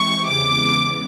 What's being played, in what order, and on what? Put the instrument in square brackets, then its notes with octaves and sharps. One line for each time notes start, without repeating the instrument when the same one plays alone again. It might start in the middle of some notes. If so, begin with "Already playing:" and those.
Already playing: [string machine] E3 G#3 C4 E4 G4 [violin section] C#6
[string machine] E2 C#3 E3 G#3 B3 [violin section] D6